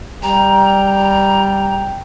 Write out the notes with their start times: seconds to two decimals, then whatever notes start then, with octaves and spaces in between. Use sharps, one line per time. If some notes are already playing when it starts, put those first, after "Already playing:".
0.23 G3 G5 A#5